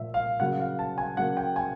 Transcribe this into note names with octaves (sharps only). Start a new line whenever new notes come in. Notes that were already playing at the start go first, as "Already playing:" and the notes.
Already playing: A#2 F3 A3 E5
F5
C#3 F#3 A#3 F#5
F5
A5
G#5
C#3 F#3 A#3 F#5
G5
G#5